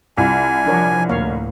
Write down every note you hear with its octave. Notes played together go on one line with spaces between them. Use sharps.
C2 F4 G#5
F3 D4 A#4 C#5
D2 A2 A#3 C#5 F5